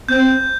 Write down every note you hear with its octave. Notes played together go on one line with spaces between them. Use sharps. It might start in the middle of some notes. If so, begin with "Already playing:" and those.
C4 G6